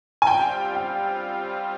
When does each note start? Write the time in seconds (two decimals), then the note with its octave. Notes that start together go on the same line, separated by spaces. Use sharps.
0.22 G#5
0.27 G3 C4 F4 G5
0.74 G5